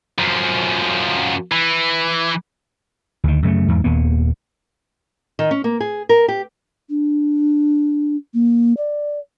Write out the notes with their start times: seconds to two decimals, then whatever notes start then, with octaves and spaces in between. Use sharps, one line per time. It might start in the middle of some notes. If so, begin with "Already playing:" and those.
0.18 F#2 F3
1.52 E3
3.24 D2 D#3
3.43 F#2 C#3 G#3 A3
3.68 E2 G#2
3.84 D#1 D#2 A#3 B3
5.39 D#3
5.51 C#4
5.64 A#3
5.81 G#4
6.09 A#4
6.28 G4
6.90 D4
8.34 A#3
8.77 D5